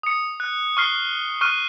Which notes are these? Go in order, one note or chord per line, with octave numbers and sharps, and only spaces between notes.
D#6 C#7
F#6
C#6 F6 C7 G7
C#6 F6 F#6 D#7